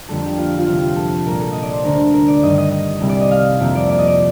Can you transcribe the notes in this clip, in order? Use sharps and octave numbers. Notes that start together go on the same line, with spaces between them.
F2 D3 G3 A#3 A4
G4
F4
F4
D2 C3 F3 G4
F4
A4
A#2 G3 A#3 A#4
A4
D#5
D5
C5
D2 D3 A3 A#4
A#4
D5
G2 D#3 G3 D#5
D#5
D#5
C2 C3 G3
D5
D#5
F5
F2 C3 D#3 A#3
D5
D5
D#5
D5